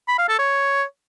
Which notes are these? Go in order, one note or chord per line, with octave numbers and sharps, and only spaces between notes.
B5
F5
A4
C#5